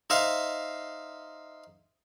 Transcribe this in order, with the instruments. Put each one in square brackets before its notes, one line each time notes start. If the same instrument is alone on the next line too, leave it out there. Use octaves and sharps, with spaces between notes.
[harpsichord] D#4 C5 E5 F5